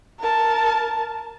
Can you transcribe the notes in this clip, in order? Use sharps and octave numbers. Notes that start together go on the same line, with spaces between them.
A#4 A5